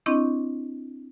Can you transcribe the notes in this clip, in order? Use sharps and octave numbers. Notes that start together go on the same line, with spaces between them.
C4 D4 E4 D#5 C#6 G6